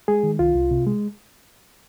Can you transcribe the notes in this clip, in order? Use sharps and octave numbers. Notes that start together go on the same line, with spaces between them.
G#3 G#4
D#3
C2 F4
C2
C3
G#3